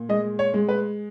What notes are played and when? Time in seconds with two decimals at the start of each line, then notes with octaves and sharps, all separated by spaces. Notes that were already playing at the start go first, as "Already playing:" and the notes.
Already playing: A#2
0.09 G#3 D#5
0.39 C#5
0.54 G#3
0.69 B4